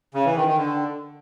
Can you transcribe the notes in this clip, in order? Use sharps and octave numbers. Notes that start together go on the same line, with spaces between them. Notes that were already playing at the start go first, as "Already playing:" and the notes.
C#3
E3
D#3
D#3
D3